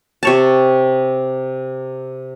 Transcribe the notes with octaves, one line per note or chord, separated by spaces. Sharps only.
C3 C#5 A5